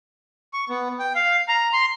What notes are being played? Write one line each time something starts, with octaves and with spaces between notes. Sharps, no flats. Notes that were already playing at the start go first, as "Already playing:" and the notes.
C#6
B3
G5
F5
A#5
C6